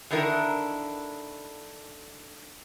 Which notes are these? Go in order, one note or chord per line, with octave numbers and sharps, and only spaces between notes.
D3 D#3 D4 E4 A#4